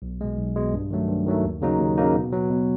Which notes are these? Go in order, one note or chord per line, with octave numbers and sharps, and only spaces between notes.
B1
B2 G#3
B1
B2 G#3
G2
D#3 F#3 A3
G2
D#3 F#3 A3
D#2
C#3 F#3 A#3 D#4
D#2
C#3 F#3 A#3 D#4
B2
F#3 B3
B2